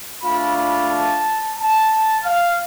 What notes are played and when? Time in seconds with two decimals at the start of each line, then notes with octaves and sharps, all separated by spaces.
0.23 A3 D4 F4 B5
0.56 B5
0.90 A5
1.57 A5
2.24 F5